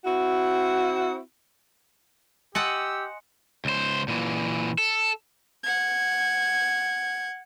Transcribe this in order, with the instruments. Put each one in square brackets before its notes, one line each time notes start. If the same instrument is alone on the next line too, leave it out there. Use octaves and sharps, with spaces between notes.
[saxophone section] C4 E4 F#4
[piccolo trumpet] G4 [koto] D#5 F#5 A5 [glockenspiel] G#5 C6 C#7 [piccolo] E6
[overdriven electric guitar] C#2 C5
A#2 E3
A4
[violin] F#5 G#6